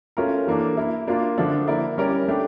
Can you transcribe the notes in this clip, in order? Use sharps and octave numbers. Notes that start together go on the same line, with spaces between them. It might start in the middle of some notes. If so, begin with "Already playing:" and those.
A3 C#4 F4 A#4
E3 A#3 D4 A4
A#3 E4 A#4
A#3 D4 F4
D3 F3 A3 D4 A4
A#3 E4 A#4 D5
G3 C#4 E4 A#4 D5
A3 D4 G4